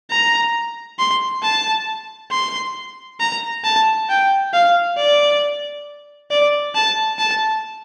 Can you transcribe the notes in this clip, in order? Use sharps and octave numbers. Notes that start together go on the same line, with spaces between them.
A#5
C6
A5
C6
A#5
A5
G5
F5
D5
D5
A5
A5